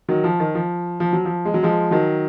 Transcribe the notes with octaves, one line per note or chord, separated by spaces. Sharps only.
D#3 F#3
F3
D#3
F3
F3
F#3
F3
G#3
F#3
F3 G#3
D#3 F#3